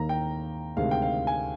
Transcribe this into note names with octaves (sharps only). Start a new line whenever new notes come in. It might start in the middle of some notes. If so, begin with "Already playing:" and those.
Already playing: D#2 D#3 A#3 A#5
G5
D2 C3 D#3 G#3 F5
G5
F5
G#5